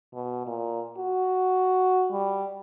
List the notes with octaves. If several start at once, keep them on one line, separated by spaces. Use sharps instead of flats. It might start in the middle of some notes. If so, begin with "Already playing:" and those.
B2
A#2
F#4
G3